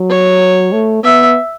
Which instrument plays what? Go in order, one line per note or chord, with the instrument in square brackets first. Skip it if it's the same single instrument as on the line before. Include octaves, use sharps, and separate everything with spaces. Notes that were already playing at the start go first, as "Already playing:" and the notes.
Already playing: [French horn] F#3
[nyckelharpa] C#5
[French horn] A3
[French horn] B3 [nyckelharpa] E5